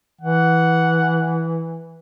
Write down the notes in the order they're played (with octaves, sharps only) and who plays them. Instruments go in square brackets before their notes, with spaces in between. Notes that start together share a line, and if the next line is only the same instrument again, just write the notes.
[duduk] E3 [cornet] F#5